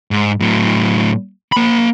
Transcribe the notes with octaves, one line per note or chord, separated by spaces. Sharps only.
G#2
A2 F#3
A#3 B5